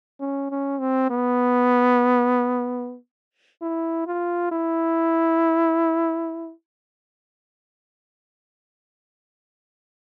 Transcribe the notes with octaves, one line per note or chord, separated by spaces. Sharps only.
C#4
C#4
C4
B3
E4
F4
E4